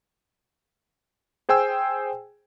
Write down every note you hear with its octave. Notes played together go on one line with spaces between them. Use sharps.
G#4 C5 G5 G#5 E6